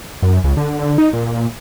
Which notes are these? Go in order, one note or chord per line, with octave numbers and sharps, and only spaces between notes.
F#2
C#2
D3
D3
D#4
A#2